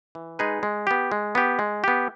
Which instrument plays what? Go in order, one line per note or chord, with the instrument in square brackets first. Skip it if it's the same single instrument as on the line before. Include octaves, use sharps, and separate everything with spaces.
[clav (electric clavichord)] E3
G#3 D#4 G#4 B4
G#3
B3 G4
G#3
B3 G4
G#3
B3 G4